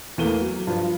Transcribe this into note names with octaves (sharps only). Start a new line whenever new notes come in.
E2 E3 A3 A#3 D#7 G7
F#3
G2 F3